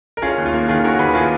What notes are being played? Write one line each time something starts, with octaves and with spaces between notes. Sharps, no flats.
A#4
C#4 F4 G#4
D#2
F4
A#3
D#3 F4 G#4
C#4 F#4 A#4
D#2 G#4 B4
A#3 F4 G#4